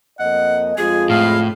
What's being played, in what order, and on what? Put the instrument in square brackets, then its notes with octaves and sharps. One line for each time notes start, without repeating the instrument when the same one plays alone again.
[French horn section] F2 A#3 D#5 [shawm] F#5
[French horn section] F2 G#3 F4 [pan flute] G#4 [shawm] G#5
[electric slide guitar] A2 [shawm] F5